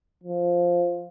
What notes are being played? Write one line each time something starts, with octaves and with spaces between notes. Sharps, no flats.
F3